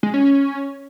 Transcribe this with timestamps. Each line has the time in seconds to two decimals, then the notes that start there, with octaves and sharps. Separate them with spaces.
0.03 G#3
0.14 C#4
0.24 C#4